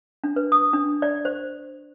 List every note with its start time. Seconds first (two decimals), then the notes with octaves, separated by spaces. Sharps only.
0.24 D4
0.36 B4
0.52 D#6
0.73 D4
1.02 D5
1.25 C5